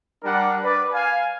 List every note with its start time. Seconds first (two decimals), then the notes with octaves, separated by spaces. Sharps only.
0.23 G3 D4 A#4 F#5
0.64 B4 D5
0.93 F5 G#5